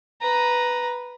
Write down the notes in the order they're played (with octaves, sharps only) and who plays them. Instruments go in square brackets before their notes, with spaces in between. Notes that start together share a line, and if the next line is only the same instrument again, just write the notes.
[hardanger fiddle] B4 A#5